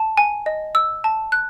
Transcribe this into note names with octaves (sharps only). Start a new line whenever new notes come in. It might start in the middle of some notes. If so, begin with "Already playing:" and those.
Already playing: A5
G#5
D#5
E6
A5
F#6